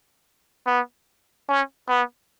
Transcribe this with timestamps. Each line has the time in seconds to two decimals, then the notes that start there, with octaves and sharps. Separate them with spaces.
0.67 B3
1.49 C#4
1.89 B3